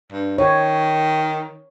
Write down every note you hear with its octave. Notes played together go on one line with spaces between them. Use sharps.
G2
D#3 C#5